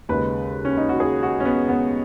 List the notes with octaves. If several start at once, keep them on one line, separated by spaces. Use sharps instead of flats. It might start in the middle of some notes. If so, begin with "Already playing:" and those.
D#2 C#3 G#3 B4
C#4
D#4
F#4
G#4
F#4
C#4
B3
B3